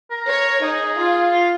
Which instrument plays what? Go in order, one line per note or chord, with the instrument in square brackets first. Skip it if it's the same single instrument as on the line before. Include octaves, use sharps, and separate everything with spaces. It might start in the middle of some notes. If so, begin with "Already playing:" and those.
[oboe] A#4
[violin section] C#5
[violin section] D#4 [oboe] G#4
[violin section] F4
[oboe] F4